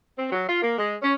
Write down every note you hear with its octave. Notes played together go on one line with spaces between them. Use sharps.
C4
F#3
F4
A#3
G#3
C#4